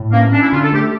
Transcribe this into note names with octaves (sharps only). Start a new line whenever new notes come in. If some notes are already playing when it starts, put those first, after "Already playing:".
Already playing: A2
A#3 C#4
C#4 D4
E4
D3 F4
A4
A3 G4